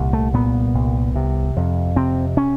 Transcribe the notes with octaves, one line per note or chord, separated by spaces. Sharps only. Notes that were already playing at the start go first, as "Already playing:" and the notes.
Already playing: C2 A#2
A3
A#2 B3
C2
C3
F2
C3 C4
C#4